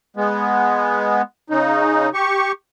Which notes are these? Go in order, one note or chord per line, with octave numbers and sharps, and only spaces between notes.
G#3 B3
C#3 D#4
G4 C#6